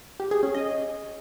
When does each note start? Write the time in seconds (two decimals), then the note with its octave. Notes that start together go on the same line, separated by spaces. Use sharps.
0.20 G4
0.31 G#4
0.43 C#4
0.54 D#5